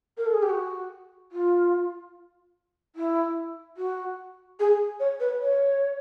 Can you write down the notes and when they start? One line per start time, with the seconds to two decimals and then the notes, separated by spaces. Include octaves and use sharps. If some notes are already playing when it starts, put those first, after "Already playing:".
0.18 A#4
0.26 A4
0.34 G#4
0.43 G4
0.50 F#4
1.32 F4
2.96 E4
3.77 F#4
4.60 G#4
5.00 C#5
5.20 B4
5.41 C#5